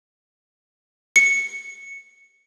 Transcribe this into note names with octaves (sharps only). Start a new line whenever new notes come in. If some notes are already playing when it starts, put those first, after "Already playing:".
C#7